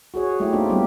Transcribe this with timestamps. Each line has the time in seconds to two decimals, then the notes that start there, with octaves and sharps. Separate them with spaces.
0.14 F#4 G#4 C#5
0.40 G#3 A3 E4 G4
0.53 G#3 A#3 C4 D4 D#4 F4
0.69 F#3 G3 A#3 B3 G4